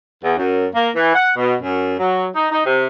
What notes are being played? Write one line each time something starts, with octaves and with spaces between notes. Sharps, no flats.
E2
F#2
A#3
E3
F#5
B2
F#2
F#3
D#4
D#4
C3